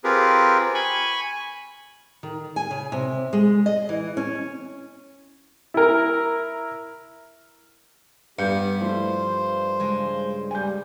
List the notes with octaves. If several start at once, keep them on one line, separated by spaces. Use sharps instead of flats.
C4 F4 G4 G#4 A#4 B4
G#5 B5 C#6
D#3
G#5
C#3
C3
G#3
D#5
E3
C#4
E4 A#4
G2 B3 G4 G6 C#7
F3 A3 E4 C5
C#3 G#3 D4
G3 G#5 G6